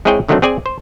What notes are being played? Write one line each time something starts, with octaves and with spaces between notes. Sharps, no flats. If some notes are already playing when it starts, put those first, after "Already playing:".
G#3 C4 E4 G#4 C#5 G5
D3 D#3 F#3 A3 C4 D4
C4 G#4 D5 G#5
C5